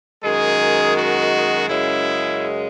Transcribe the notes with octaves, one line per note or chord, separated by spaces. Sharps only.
F#2 D#3 G#3 G#4
F#4
F#2 C#3 G#3 E4